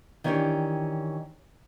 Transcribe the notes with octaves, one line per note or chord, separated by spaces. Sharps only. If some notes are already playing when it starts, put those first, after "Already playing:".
D#3 E3 C#4 D4 G4 C#5